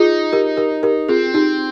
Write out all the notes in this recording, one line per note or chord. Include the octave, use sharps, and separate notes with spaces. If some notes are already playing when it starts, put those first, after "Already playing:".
Already playing: D#4 F4 G#4
G4 A#4
G4 A#4
G4 A#4
C4 F4 G#4
D#4 G4